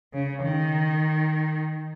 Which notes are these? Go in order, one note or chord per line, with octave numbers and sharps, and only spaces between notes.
C#3
D#3